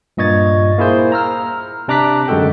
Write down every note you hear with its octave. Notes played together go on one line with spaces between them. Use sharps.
G2 A#2 D#5 C#6 G#6 A6
A#3 E4 G#4 C5
A#5 E6 F6
C3 D4 A#5 D6 F#6 B6
F#2 D3 G#3 F#4 A4 G5